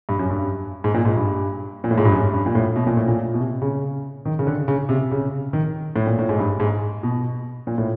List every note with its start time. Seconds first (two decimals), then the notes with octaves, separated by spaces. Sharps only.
0.09 G2
0.19 F#2
0.30 G2
0.84 G#2
0.94 A#2
1.05 G#2
1.16 G2
1.84 A#2
1.91 A2
1.98 G#2
2.05 G2
2.12 F#2
2.34 G2
2.46 A#2
2.55 A2
2.76 B2
2.87 A#2
2.97 A2
3.08 A#2
3.34 B2
3.40 C3
3.62 C#3
4.25 D#3
4.39 C#3
4.47 D3
4.68 C#3
4.89 C3
5.11 C#3
5.53 D#3
5.96 A2
6.07 A#2
6.19 A2
6.29 G#2
6.39 G2
6.60 G#2
7.03 B2
7.67 A#2
7.78 A2